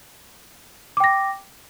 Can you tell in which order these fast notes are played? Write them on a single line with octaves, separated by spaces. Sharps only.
D6 G5 A#6